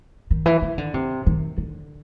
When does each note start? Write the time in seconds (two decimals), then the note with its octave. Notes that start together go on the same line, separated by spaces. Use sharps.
0.31 D#3
0.46 E3
0.62 D#3
0.78 D3
0.94 C3
1.26 D#3
1.58 D3